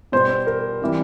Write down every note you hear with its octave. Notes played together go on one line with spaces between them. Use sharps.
B2 G3 B3 C5
A#4
C3 E3 G3